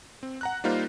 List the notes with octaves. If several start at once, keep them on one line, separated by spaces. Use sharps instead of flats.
C4
F#5 A#5 F#6
G3 A#3 D#4 F4 A#4 C5